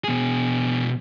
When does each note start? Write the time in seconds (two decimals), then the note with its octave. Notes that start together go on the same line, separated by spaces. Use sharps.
0.04 B2 G#4